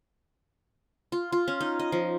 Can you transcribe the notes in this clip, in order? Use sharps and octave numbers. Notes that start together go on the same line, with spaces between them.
F4
F4
C#4
D#4
D#5
F3